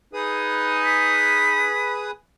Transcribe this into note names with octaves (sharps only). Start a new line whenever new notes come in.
D#4 G#4 B4 D#6
B6